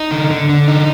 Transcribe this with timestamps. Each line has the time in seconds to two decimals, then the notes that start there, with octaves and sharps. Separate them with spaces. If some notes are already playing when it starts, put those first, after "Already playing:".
Already playing: D#4
0.11 D3
0.31 D3
0.49 D3
0.68 D#4